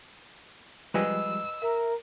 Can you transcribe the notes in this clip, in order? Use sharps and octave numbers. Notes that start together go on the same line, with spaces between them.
F3 G3 G#3 B4 D#5 G#5 E6
A#4 E5